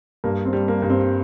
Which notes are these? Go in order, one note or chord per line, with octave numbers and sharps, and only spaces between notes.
G2 A#3
C4
G3
A#3
G2
C4